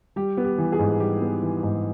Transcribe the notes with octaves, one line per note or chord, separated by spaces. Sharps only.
G3 G4
B3
G4
E3
G#4
G#2
G3 G4
B3
E3
G#2